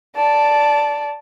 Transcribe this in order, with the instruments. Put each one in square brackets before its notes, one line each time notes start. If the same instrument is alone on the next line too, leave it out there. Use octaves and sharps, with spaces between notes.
[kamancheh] D5 A5